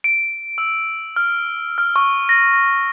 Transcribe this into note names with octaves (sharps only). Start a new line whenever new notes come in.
D7
E6
F6
F6
C#6
A#6
A#6